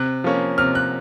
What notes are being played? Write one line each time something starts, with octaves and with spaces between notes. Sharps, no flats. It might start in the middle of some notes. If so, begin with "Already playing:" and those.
Already playing: C3 F#6
F3 A#3 C#4
C3 F6
F#6